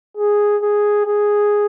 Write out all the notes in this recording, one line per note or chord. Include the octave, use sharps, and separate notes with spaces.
G#4
G#4
G#4